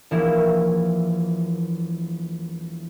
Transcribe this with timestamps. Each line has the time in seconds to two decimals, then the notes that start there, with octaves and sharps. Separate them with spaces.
0.11 E1 E3 F3 A#3 E4